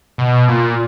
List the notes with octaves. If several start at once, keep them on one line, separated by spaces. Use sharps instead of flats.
B2
A#2